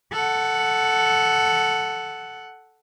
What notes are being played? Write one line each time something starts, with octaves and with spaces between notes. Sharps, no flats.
A4 F#5